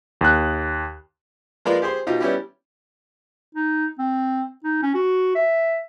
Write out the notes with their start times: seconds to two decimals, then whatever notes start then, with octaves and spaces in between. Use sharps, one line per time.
0.21 D#2 F#6
1.65 F3 G#3 A#3 A#4 B4 D5
1.82 G4 G#4 C5 C6
2.07 B2 D#4 F4 G4
2.20 G3 B3 C#4 E4 G4
3.55 D#4
3.99 C4
4.64 D#4
4.83 C#4
4.94 F#4
5.35 E5